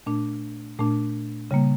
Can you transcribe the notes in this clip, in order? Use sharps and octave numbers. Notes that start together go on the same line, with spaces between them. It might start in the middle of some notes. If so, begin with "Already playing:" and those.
A#2 A3 D4
A#2 A3 D4
C#3 G3 A#3